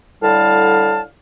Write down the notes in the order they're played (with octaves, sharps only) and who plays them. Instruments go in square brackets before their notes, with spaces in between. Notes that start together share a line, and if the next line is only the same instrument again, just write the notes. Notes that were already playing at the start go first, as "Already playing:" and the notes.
[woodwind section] A2 D3 G3 F5 A5